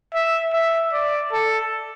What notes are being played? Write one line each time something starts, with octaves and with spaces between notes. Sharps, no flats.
E5
E5
D5
A4